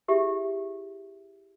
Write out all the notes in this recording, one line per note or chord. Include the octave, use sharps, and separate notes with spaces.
E4 G4 G#4 E5